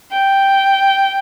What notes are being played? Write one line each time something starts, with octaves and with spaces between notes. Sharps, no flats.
G5